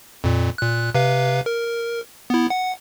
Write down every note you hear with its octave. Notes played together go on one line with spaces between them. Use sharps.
F2 A#2
A#2 F#6
C3 B4 F5
A#4
B3 E4
F#5